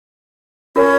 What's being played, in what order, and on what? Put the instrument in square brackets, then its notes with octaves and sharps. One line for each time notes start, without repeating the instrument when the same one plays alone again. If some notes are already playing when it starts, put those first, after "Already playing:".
[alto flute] C#4 [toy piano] F4 A#4